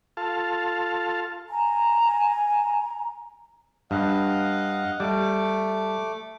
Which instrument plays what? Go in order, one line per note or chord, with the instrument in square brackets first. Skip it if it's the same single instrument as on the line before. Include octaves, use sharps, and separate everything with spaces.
[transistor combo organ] F4 A4 F5 A5
[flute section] G#5 A#5
[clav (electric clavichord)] G2 [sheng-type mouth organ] D#5 F5 F#5
[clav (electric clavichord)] G3 [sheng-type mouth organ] A3 D6